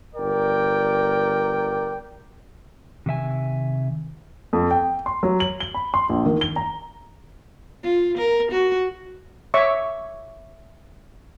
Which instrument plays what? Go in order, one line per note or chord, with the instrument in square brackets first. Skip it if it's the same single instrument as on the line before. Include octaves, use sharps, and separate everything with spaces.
[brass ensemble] G1 A#4 D5 G5
[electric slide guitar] C3 D#3 E5 G#5
[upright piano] F2
G5
C6
F#3
F#7
G7
B5
C6
A#1
D#3
G7
A#5
[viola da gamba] F4
A#4
F#4
[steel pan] C#5 E5 C#6 D6